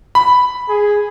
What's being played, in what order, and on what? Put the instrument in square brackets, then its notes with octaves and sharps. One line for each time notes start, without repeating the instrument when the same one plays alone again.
[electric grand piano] B5
[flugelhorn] G#4